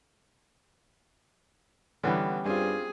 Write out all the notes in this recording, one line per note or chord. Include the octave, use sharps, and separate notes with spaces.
D3 E3 G3 B3 C#4
G2 C4 F4 G#4